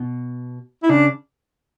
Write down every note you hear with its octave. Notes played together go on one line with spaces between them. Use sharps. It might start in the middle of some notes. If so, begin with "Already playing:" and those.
Already playing: B2
E4
C#3 D4